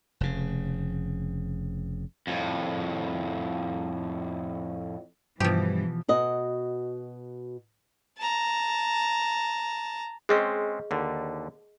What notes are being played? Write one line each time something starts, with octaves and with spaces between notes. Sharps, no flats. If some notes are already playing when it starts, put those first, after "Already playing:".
F1 C#3
F2 A2
G2 B2 E3 F3 G4
B2 F#4 D#5
A5 A#5
G#3 C4 C#4 G#4 D#5 C#6
D#2 D3